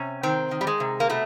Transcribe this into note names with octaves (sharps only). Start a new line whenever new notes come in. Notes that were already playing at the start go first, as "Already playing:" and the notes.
Already playing: C3 C#4
D#3 C4
D#3
G3
G#3
C3
A#3
B2 A3